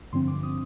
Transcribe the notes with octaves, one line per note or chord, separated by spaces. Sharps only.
G2 D3 F3 C4 C6
D6
D#6